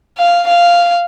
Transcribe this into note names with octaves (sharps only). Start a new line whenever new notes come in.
F5
F5